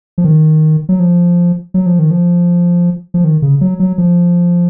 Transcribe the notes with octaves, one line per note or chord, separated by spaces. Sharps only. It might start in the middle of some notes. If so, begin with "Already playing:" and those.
F3
D#3
F#3
F3
F#3
F3
D#3
F3
F3
D#3
C#3
F#3
F#3
F3